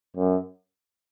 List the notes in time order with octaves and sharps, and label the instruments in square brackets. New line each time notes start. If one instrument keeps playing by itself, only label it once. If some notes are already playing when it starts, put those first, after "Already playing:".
[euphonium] F#2